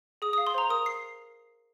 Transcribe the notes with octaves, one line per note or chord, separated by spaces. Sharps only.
G#4 D#6
D#6
F5
C6
C5 A#5
A#4 D#6
A#4 C7